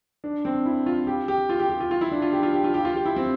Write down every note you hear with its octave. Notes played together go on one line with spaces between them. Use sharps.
D4
C4
E4
F4
G4
G4
F4
G4
G4
F4
F4
E4
D4
F4
G4
F4
G4
F4
G4
F4
G4
E4
C4